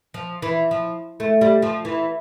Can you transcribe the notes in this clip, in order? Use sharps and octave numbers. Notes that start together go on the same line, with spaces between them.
F3
E3
F3
A3
G3
F3
E3